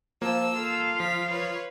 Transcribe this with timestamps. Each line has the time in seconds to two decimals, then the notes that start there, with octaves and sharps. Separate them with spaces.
0.22 F3 A#3 A5 E6
0.56 F4 A4 F5
1.00 F3 B6
1.30 B4 C#5